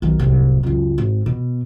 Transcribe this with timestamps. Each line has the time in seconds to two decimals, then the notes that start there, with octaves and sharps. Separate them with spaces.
0.02 B1 D#3
0.19 D1 C2
0.63 F#1 C#2
0.98 G#1
1.26 B2